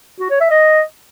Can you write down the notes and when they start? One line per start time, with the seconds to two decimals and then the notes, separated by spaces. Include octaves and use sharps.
0.20 F#4
0.30 C#5
0.40 E5
0.51 D#5